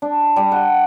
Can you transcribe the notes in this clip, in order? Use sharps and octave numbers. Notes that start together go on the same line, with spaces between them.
D4
G3
F#5